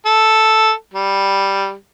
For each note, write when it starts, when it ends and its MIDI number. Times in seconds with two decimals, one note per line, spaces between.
0.06 0.72 69
0.94 1.73 55